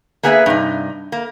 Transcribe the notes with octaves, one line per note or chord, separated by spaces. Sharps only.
A#3 B3 G#4 B4 D#5 E5
G2 C3 D#4
A#3